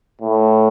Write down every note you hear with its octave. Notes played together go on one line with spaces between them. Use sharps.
A2